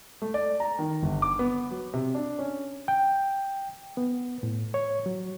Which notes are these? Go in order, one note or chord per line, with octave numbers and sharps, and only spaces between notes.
A3
D5
A#5
D#3
G1
D6
B3
F#3
C3
D4
C#4
G5
B3
A2
C#5
F#3